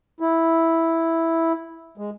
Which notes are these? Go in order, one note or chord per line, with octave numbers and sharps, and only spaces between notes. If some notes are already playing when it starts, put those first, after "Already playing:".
E4
G#3